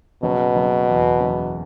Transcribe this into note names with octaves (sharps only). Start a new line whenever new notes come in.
F#1 B2
F#1
E2
F#1